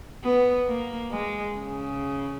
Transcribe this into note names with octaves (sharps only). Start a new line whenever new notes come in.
B3
A#3
G#3
C#3